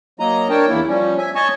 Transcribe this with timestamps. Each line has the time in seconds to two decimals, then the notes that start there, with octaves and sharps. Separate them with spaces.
0.20 F#3 A#3 D#5 A#5
0.50 D4 A#4 C#5 G5 A5
0.68 E2 A#3 E4
0.88 F3 G3 C#4
1.18 E5 G#5
1.35 C#5 D#5 G#5 A5 C#6